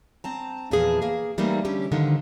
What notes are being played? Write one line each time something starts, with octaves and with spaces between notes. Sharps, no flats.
C4 A5 A#5
E2 A#2 E3 F3 G#4 A5
A#3 G#4
E3 G3 A3 A#3 C4 D#4
D3 C#4 G4
D3 D#3 F3 D#4